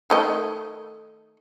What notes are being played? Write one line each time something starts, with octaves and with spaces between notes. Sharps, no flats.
D#3 A3 D#5